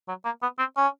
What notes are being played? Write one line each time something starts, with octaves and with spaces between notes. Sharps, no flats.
F#3
A#3
B3
C4
C#4